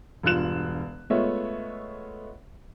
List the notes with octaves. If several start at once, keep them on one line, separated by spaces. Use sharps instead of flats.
E1 G2 F4 F#6 E7
G#3 A3 B3 F4 C#5 E5